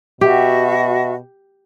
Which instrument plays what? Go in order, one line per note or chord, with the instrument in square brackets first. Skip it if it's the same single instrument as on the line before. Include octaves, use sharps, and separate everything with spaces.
[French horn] B2 [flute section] F#4 E5 [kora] G4